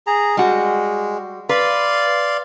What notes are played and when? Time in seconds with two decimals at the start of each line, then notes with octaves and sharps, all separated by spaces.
0.07 G#4 A#5
0.37 G3 G#3 F#4
1.49 B4 D5 F5 C6